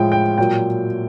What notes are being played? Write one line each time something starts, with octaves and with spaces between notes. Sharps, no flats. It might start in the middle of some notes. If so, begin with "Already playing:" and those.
Already playing: A2 F3 G#3 G5
G5
A#2 F#3 G5